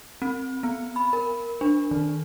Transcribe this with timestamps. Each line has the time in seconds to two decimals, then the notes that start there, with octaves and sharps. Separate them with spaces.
0.22 C4
0.63 B3
0.96 B5
1.13 A#4
1.61 D4
1.91 D#3